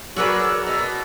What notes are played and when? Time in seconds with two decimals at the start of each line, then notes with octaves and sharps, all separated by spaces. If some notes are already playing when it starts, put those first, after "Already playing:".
0.16 F#3 F#4 G#4 A#4 B4 D5 E6
0.66 B2